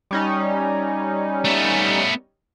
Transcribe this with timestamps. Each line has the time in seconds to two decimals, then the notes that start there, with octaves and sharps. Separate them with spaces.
0.11 G3 C#4 D#4
1.45 A3 B3